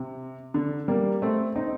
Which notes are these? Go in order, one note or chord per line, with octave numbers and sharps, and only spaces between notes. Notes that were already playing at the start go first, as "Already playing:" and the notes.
Already playing: C3
D3
G3 A#3
A3 C4
C4 D#4